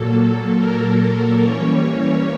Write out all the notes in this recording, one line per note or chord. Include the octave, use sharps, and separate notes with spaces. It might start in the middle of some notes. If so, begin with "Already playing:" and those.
Already playing: A#2 F#3 A#3 A4
A#4
E3 G3 A#3 C#4 C#5